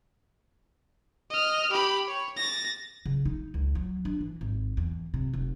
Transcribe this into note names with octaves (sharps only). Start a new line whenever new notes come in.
D#5 F6
G4 B5
C#5
A6 A#6
C#3
D#4
C#2
F#3
D4
E3
G#1
E2
C3
F1